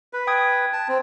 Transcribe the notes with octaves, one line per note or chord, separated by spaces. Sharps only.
B4
G5 D#6 G#6
A5
C4